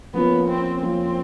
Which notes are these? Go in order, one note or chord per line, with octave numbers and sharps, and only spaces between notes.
F3 A#3 B3 C#4 F4 A#4
C4
F3 A#3 C4 C#4 F4 A#4